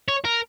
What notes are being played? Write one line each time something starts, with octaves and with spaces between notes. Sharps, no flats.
C#5
A#4